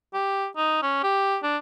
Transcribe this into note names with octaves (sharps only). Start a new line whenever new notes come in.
G4
D#4
C#4
G4
D4